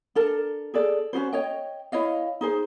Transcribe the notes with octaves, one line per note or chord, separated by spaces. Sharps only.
D4 A4 A#4
G#4 A4 D5
C#4 D#4 F#4 C5
C#5 D#5 G5
E4 C#5 D#5 F5
D#4 G#4 C5